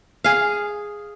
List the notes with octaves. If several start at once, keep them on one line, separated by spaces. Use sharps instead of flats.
G#4 F5